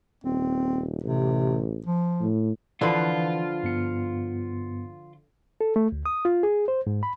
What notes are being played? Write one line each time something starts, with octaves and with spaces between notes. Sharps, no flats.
D#1 C4
A1 C3
F3
A2
D3 E3 F3 F4 B4
G2 B3 C#7
A4
A3
D2
D#6
F4
G#4
C5
G#2
B5